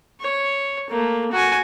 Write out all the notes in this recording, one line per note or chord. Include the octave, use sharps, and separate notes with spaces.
C#5
A3 A#3
F#4 G#5